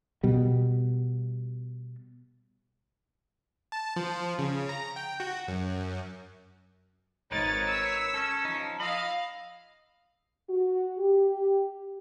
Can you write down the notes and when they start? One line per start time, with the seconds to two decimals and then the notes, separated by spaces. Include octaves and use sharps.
0.23 B2 G3
3.72 A5
3.96 F3
4.39 C#3
4.69 A#5
4.96 G5
5.20 F#4
5.48 F#2
7.32 G#1 D#4 A#4 B4 C#5 A6
7.68 E6 B6
8.14 C#4 A4
8.45 F3 D#4
8.80 D#5 F5 B5 E6
10.48 F#4
10.98 G4